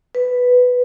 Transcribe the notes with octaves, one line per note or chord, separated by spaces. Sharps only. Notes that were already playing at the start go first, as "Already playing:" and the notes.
B4